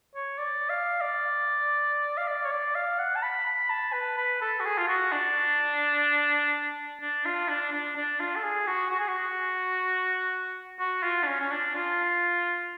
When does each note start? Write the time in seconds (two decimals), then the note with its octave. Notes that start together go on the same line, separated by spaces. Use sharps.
0.15 C#5
0.38 D5
0.70 F5
1.01 D5
2.18 F5
2.28 D5
2.45 C#5
2.51 D5
2.75 F5
2.99 F#5
3.16 A5
3.22 B5
3.46 B5
3.70 A5
3.93 B4
4.17 B4
4.41 A4
4.60 F#4
4.65 G#4
4.78 F4
4.88 F#4
5.12 D4
7.01 D4
7.25 F4
7.48 D4
7.72 D4
7.96 D4
8.20 F4
8.36 A4
8.44 G#4
8.67 F#4
8.91 F#4
8.99 G#4
9.08 F#4
10.79 F#4
11.03 F4
11.23 D4
11.27 C#4
11.40 C#4
11.52 D4
11.75 F4